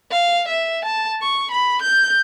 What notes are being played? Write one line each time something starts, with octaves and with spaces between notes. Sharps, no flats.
F5
E5
A5
C#6
B5
G6